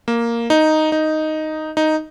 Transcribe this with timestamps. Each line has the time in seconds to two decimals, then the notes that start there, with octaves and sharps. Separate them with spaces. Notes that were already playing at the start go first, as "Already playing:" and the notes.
0.08 A#3
0.50 D#4
0.92 D#4
1.77 D#4